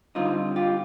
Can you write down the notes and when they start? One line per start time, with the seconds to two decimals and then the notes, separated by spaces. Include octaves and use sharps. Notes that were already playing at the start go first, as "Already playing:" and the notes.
0.15 D3 G3 C4 D#4 F4
0.56 F4 G4